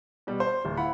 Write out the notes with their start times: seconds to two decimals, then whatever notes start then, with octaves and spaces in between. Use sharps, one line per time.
0.27 B2 G3
0.40 C5
0.65 D1
0.77 E4 F5 F#5 B5